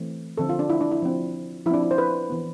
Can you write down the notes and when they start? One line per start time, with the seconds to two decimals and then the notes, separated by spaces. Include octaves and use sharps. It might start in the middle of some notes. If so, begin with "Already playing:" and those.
Already playing: E3 A3 C4
0.37 D3 F3 C4 A4
0.49 F4
0.59 D4
0.70 E4
0.81 D4
0.92 E4
1.02 F3 C4
1.66 F3 E4
1.71 C4 D4
1.83 E4
1.91 C5
1.98 B4
2.30 E3 B3